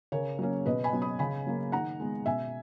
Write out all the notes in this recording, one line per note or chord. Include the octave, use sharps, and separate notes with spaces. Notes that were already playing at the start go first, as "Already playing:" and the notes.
C#3 A#4 C#5
F#3 A#3 C#4
B2 B4 D#5
G#5 B5
F#3 B3
B5 D#6
C#3 G#5 B5
F#3 A#3
D#3 F#5 A#5
G#3 B3
B2 E5 G#5